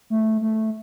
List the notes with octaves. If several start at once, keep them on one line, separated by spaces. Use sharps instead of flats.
A3
A3